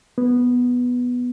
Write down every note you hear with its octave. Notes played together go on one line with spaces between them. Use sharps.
B3